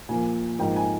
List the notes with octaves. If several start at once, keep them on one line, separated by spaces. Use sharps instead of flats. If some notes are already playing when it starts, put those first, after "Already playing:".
A#2 F3 A#3 G#5
G#2 F3 A#3 G5
G#5